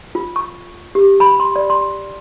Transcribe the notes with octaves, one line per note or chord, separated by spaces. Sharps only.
F4
C#6
G4
B5
C6
D5
C6